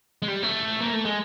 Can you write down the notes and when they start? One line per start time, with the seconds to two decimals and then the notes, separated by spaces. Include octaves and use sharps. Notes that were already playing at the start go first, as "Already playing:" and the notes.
0.22 G#3
0.28 G3
0.43 A3
0.81 A#3
0.93 A3
1.05 G#3